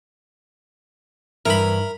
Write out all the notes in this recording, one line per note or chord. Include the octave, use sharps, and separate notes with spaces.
G2 E3 A#4 E5 B5